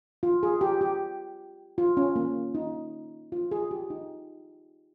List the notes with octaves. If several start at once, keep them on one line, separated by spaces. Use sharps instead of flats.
F4
G#4
G4
G4
F4
C#4
A#3
D#4
F4
G#4
G4
D#4